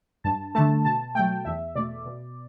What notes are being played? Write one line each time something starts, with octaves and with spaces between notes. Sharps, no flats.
G2 A5
D3 A3 A5
B2 A5
F#3 A3 G5
E2 E5
B2 A3 D5
B2